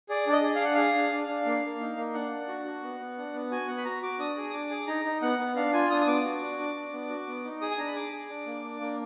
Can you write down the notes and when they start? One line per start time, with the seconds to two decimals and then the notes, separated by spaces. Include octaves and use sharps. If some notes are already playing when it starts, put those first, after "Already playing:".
0.09 G#4 D5
0.27 D4 D5
0.32 D#5
0.43 G#4
0.55 F5
0.61 D4 F#5
0.75 G#4 F5
0.95 D4
1.12 D4
1.29 D4
1.46 A#3
1.64 A#3
1.81 D#4
1.97 A#3
2.14 D4 F#5
2.31 D4
2.48 F#4
2.65 F#4
2.83 B3
3.00 B3
3.18 D4
3.34 B3
3.51 F#4 G#5
3.68 B3 F#5
3.78 B5
3.85 F#4 A#5
4.03 F#4 D6
4.19 D4 D#6
4.37 G#4
4.50 D#6
4.53 D4 D6
4.70 G#4
4.87 D#4 A#5
5.05 D#4
5.22 B3 F#5
5.39 B3
5.56 D4 F5
5.73 F4 G#5
5.90 D4 D#6
6.01 D#6
6.07 B3 D6
6.24 F#4
6.41 D4
6.59 D4
6.75 D4
6.93 B3
7.10 F#4
7.27 B3
7.45 D#4
7.61 G#4 D#6
7.71 G#5
7.78 D4 A#5
7.87 B5
7.95 G#4 D6
8.12 G#4
8.29 D4
8.46 A#3
8.64 D4
8.81 A#3